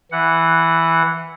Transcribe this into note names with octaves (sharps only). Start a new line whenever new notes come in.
E3 F#5